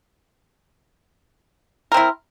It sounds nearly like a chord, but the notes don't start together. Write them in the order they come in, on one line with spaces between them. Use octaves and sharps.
A#4 C4 E4